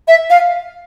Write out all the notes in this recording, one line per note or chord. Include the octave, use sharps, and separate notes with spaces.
E5
F5